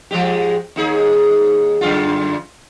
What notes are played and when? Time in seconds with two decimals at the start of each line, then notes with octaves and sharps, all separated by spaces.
0.11 F3 G#3 G4
0.76 D#2 D#4 G#4
1.81 F#2 D3 F4